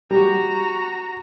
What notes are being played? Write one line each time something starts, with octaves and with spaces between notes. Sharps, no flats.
G3 F#4 A#5